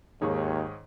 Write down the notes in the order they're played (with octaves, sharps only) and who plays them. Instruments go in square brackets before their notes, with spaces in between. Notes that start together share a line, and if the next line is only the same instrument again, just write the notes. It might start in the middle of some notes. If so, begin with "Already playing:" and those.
[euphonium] D#2 [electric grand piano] G#2 G#4 C#5 [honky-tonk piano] D#3